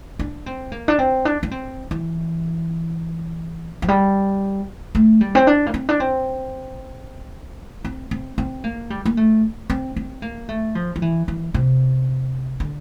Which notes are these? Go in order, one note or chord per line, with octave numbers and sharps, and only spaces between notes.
D4
C4
A#3
D4
C4
D4
D4
C4
E3
F3
G3
A3
G3
C4
D4
A#3
C4
D4
C4
C4
C4
C4
A#3
G3
A#3
A3
C4
C4
A#3
A3
F3
F3
E3
E3
C3
D3